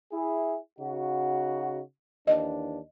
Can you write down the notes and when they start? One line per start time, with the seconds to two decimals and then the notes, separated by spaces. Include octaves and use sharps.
0.12 E4 G#4
0.79 C#3 D#4 F#4
2.27 D#2 E3 D4 D#5